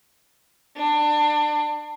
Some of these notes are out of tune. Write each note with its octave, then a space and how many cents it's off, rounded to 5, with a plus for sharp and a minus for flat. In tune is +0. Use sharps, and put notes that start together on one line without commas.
D4 +25